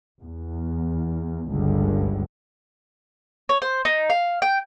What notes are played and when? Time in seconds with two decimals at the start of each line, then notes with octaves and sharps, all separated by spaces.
0.22 E2
1.50 G1 C#2 G2 D3
3.49 C#5
3.62 C5
3.85 D#4
4.10 F5
4.42 G5